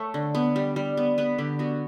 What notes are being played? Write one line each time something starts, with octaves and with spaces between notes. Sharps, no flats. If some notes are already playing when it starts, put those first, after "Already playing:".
Already playing: A3 C#5
D3
B3
G3
G3
B3
B3 B4
D3 G4
B3 F#4